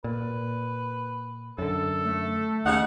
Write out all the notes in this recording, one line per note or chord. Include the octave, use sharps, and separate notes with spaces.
A#2 B4
F#2 D3 A4
A3
D#2 C#3 D#4 F#5